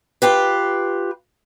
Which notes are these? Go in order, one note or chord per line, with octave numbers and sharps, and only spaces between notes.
F4 G4 B4